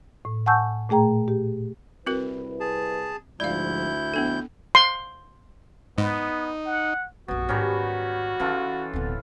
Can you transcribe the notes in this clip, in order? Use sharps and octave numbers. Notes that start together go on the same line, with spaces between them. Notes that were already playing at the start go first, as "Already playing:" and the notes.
A2
F#5 G#5 A5 C#6 E6 G6
A#2 A3 G#4 G5 A#5
G4
C2 C4 E4 F#4 A#4 B4
G#4 A5
D2 G#2 D3 F3 E4 D5 F5 G6
F2 B3 D4 A4
C6
G#2 B3 D#4
F#5
A#1 F#2 B2 F#4
G#2 D#3 G3 C#4
E3 C#4 F4 A4
D1 B2 D3